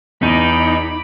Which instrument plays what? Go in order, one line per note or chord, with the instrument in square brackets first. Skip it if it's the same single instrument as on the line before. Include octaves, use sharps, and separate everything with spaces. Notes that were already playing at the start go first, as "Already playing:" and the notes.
[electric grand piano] E2 D#7 [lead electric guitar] D#4 [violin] B5 D6